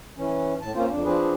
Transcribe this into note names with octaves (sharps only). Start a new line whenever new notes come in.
E3 C#4
A2 A5
A#3 C4 C#4 F4 C5
F2 D4
F3 C4 D4 G#4 B4